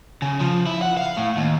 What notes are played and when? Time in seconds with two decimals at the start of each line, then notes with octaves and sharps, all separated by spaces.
0.22 C#3
0.40 F3
0.66 E4
0.82 F#5
0.97 F5
1.17 A2
1.37 D#2